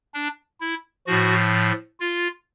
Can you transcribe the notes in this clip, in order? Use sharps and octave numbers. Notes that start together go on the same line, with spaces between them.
D4
E4
A2 F3 F#4
F4